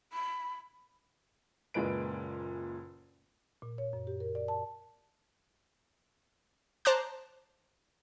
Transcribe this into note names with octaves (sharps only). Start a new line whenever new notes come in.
B5
F#1 A#2 G#3 B4 D7
A#2
C#5
F#2
G4
A#4
D5
A5
C5 A5 A#5 D6 F#6